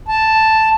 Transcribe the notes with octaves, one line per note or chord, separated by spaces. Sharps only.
A5